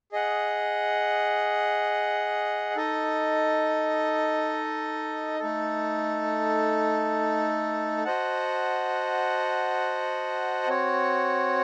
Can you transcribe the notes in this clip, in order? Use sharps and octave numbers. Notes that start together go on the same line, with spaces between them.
G#4 D#5 F#5
D#4 A4 D#5
A3 D#4 A4
F#4 C5 D#5 F#5 A5
C4 F#4 C#5